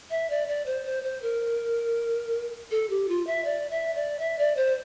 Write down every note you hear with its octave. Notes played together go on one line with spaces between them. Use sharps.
E5
D5
D5
C5
C5
C5
A#4
A4
G4
F4
E5
D5
E5
D5
E5
D5
C5